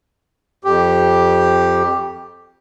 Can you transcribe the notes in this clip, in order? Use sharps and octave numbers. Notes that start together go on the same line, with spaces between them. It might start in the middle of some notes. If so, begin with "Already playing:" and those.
F2 G4